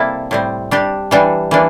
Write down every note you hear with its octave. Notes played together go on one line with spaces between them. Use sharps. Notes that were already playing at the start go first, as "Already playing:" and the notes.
Already playing: C3 G3 A#3 E4 A4
A2 G3 C4
G3 D4 G4
E3 G3 D4
E3 A#3 D4